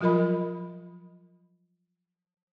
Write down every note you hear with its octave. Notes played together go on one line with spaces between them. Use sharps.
F3 F#3 F4 A#4 D#5 B5